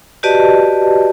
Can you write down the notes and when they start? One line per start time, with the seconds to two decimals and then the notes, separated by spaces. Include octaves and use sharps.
0.23 F#4 G4 B4 D5 D#5 A5